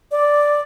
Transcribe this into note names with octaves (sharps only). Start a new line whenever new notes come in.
D5